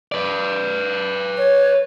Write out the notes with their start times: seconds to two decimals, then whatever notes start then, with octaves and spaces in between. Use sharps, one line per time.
0.12 B4 D5
1.38 C#5